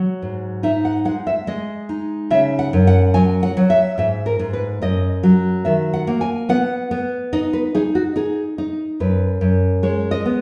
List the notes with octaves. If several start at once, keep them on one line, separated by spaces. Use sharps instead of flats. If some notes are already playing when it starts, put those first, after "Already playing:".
Already playing: F#3
G#2
D#4 E5
F#5
G#3 F#5
E5
G#3 D#5
D#4
C#3 E5
F#5
F#2
F#5
F#3 G#5
F#5
F#3
E5
G#2 E5
A#4
G#2
B4
F#2 D#5
F#3
D#3 E5
F#5
A#3
G#5
B3 F#5
B3
D#4 D#5
B4
D#4 G#4
F#4
D#4 G#4
D#4
F#2 B4
F#2
G#3 C#5
D#5
B3